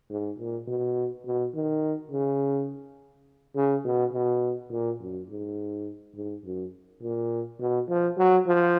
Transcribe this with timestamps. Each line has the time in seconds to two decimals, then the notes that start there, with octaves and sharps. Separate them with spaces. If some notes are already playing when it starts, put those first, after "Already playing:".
0.10 G#2
0.39 A#2
0.67 B2
1.26 B2
1.54 D#3
2.11 C#3
3.56 C#3
3.85 B2
4.13 B2
4.71 A#2
5.01 F#2
5.29 G#2
6.16 G#2
6.45 F#2
7.02 A#2
7.60 B2
7.89 F3
8.17 F#3
8.47 F3